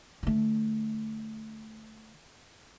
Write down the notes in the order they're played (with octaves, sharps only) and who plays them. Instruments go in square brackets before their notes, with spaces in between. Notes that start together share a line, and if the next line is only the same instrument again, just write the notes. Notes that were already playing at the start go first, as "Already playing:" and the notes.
[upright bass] D3 A3